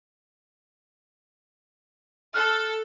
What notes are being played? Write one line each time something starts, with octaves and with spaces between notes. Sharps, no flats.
A4 F6 F#6